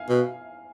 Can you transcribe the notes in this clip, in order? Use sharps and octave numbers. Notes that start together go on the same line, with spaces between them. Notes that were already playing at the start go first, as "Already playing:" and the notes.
Already playing: F5 G#5
B2